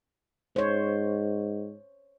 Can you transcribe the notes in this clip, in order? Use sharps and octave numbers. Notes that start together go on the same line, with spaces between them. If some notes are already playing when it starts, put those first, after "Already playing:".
G#2 C5 C#5